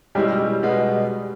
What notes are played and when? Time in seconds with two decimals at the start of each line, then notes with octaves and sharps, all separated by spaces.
0.15 B2 G3 G#3 C#4 E4 G4
0.63 B2 G#3 B3